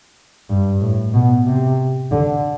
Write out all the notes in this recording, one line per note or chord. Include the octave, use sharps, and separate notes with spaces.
G2
A2
B2
C3
D3